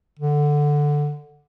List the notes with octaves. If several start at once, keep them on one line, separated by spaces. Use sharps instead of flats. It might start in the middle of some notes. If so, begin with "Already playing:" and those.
D3